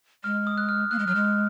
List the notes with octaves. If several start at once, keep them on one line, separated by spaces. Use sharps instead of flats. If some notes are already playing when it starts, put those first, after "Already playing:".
G#3 F6
D#6
F#6
F6
A#3 F#6
G#3
F#3 F6
G#3